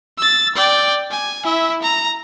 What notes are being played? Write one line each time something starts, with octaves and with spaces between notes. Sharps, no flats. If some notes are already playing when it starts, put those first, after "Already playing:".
E6 A6
D5 G5
G#5
E4 E5
A#5